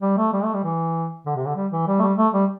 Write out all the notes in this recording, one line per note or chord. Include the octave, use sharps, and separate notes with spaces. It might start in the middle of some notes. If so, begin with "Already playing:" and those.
G3
A3
G3
A3
G3
E3
D3
C3
D3
G3
E3
G3
A3
G3
A3
G3